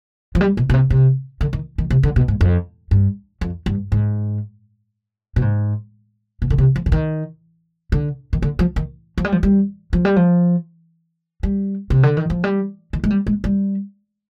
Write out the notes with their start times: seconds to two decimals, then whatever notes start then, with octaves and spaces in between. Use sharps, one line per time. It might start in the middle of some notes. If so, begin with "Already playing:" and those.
0.35 F3
0.41 G3
0.57 B2
0.70 B2
0.74 C3
0.90 C3
1.41 D3
1.53 D#3
1.78 D#3
1.90 C3
2.03 D3
2.16 B2
2.28 G#2
2.41 F2
2.91 G2
3.41 F2
3.66 G2
3.92 G#2
5.36 B2
5.42 G#2
6.42 B2
6.50 D3
6.58 C3
6.76 F3
6.86 D3
6.92 D#3
7.92 D3
8.33 D#3
8.42 D3
8.59 F3
8.76 D#3
9.18 F3
9.24 G3
9.32 F3
9.43 G3
9.93 F3
10.05 G3
10.16 F3
11.43 G3
11.90 C3
12.03 D3
12.17 D#3
12.30 F3
12.44 G3
12.93 D#3
13.04 G#3
13.10 G3
13.27 G#3
13.44 G3